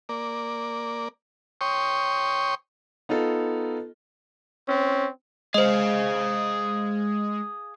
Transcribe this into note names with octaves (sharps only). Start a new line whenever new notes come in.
A#3 D5
C#5 G5 C6 C#6 D#6
B3 D#4 F4 A4
C4 C#4
G#3 G#4 C5 D#5 F5